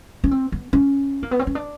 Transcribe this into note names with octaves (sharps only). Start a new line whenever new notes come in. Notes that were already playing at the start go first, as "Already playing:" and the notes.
C#4
C4
B3
C#4
A#3
B3
C4
C#4
D4